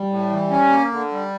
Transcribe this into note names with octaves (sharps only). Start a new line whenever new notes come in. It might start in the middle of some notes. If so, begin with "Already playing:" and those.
Already playing: G3
A2
E3
C#4
A#3
D3
G3